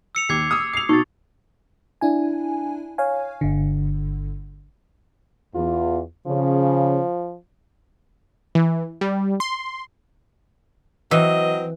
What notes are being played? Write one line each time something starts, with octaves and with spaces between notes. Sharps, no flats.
E6 C#7 F7
D#2 D6 G#6 C7
D#6 E6
D#6 C7 F7
B2 D#4 C#6 A6
D4 E4 G#5
C#5 F5 G#5
G1 D3
E2 F4
C#3 F3
E3
G3
C6
E3 F#3 C4 D#5